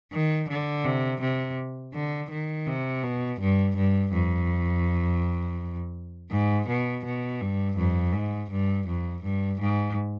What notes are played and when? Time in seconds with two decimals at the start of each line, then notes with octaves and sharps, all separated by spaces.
0.12 D#3
0.49 D3
0.85 C3
1.21 C3
1.94 D3
2.31 D#3
2.67 C3
3.03 B2
3.40 G2
3.76 G2
4.13 F2
6.31 G#2
6.68 B2
7.05 B2
7.41 G2
7.77 F2
8.13 G#2
8.51 G2
8.87 F2
9.23 G2
9.60 G#2